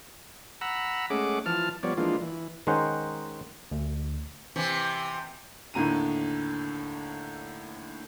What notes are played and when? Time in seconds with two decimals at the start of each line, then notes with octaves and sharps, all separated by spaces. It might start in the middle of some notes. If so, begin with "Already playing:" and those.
0.61 F#5 A#5 B5 E6
1.10 G#3 A3 C#4 G#4 F#5 D6
1.46 E3 F3 A5 F6
1.83 F3 G3 B3 C#5 D5
1.97 E3 F3 G#3 A#3 D4 F4
2.21 E3
2.67 D#3 G#3 C#4 D#4 C5 F#5
3.71 D2
4.56 C3 E3
5.74 D#2 A2 D3 A#5 D#7